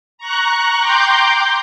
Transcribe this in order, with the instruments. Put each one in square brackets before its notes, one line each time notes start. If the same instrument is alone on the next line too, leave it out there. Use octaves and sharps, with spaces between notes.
[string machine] A#5 C#6 F#6
G5 A#5 C6 D6 G6